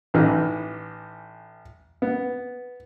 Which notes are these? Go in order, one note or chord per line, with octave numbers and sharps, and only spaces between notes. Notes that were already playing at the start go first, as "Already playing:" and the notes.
A1 E3 D#4 F6
B3